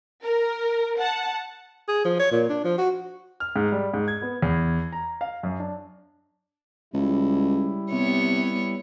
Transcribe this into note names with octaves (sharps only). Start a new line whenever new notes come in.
A#4
F#5 A5
G#4
F3
C#5
A#2
D4
F3
F#4
F6
G#2
G3
G#2
G#6
B3
E2
A#5
F5
F#2
D4
C#2 G3 E4
C3 B3 C#5